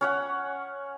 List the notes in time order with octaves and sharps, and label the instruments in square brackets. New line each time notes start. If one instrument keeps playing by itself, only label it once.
[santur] C#4 C#5 F#5